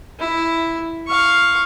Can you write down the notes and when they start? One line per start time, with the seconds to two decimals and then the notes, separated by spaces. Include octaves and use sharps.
0.20 E4
1.08 F5 C#6